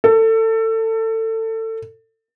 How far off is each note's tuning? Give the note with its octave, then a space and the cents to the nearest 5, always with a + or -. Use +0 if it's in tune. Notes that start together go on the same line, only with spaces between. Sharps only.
A4 +25